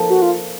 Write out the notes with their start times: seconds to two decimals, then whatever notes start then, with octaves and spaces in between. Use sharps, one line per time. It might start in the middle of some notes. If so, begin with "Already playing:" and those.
Already playing: F3 A#3 D#4 A4
0.10 F#4
0.22 F4